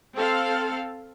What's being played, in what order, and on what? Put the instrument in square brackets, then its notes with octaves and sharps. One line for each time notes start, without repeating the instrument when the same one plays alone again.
[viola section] C4 A4 F5